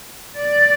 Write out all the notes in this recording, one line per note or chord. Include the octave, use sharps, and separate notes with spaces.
D5